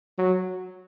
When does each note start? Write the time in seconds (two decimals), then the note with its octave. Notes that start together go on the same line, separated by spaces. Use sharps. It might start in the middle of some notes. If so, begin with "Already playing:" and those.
0.18 F#3